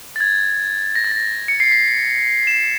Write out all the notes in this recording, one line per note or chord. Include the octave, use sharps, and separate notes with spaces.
A6
G#6
A#6
A6
A#6
C#7
C7
B6
E7